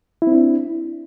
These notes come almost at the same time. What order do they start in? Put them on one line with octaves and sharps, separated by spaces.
E4 C4 D4